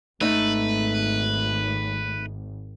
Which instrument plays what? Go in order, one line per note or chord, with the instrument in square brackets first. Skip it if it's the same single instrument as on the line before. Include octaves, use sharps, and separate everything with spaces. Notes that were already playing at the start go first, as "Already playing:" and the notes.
[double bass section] G#1 [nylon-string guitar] A3 D#4 [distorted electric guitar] B4